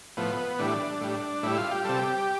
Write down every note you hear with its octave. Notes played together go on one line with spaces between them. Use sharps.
A2 F3 B3
A2 E3 G3 D4
A2 G3
A2 G3 E4
F4
G4
C3 G3 A4
G4